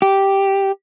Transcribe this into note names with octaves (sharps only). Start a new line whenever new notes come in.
G4